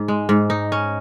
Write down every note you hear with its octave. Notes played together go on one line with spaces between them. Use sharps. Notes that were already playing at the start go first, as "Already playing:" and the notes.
Already playing: G#2
G#3
G#2
D#4
C#4